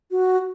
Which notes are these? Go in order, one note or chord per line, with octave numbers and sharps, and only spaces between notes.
F#4